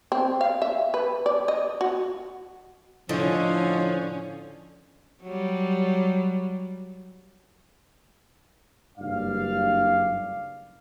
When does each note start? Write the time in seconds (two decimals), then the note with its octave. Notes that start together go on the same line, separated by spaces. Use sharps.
0.12 C4
0.41 F5
0.62 E5
0.94 B4
1.26 D5
1.48 D#5
1.81 F#4
3.09 A2 D3 F3 C#4 D4 F4 D#5
5.23 F#3 G3
8.98 F#1 G2 D5 F5